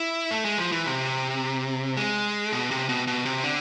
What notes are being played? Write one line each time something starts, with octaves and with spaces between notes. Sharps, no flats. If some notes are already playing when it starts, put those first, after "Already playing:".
Already playing: E4
A3
G#3
F3
E3
C3
G#3
B2
C3
B2
B2
C3
D3